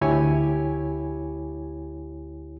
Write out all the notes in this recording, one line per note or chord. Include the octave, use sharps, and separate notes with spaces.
D2 E4 G4 C#5 G#5